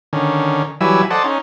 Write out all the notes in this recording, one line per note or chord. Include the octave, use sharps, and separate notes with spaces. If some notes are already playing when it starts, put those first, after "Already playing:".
D3 D#3 C#4
E3 F#3 G3 E4 G#5 E6
A4 C5 D5 D#5 F#5 A5
C#4 D#4